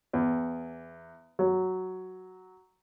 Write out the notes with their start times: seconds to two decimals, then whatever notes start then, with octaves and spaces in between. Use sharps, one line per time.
0.13 E2
1.39 F#3